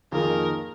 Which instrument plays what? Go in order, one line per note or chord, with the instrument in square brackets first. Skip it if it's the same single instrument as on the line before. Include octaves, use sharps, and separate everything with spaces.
[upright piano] F2 D#3 A#3 F4 G#4 [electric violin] A#4